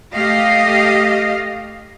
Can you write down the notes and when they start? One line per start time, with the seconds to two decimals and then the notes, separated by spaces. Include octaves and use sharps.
0.13 A3 G4 D#5 F5